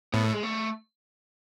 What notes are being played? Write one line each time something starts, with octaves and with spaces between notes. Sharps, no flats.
A2 B3
A3
G#3
A3